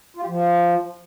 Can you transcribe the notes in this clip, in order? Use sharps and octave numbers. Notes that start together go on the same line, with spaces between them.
F4
G4
F3